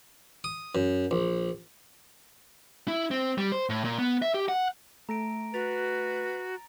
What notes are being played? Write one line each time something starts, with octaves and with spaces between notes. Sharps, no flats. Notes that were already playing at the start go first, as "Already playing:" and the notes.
D#6
F#2
A#1
E4
C4
G3
C5
A2
A#2
B3
E5
G4
F#5
A3 A#5 A#6 D7
F#4 B4 A6 F7